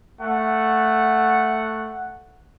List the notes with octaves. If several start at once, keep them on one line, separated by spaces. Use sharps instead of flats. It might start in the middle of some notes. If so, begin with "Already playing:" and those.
A3 F#5